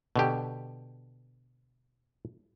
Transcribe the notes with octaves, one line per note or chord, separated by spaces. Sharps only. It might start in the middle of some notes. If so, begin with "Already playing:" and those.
B2 D3 G4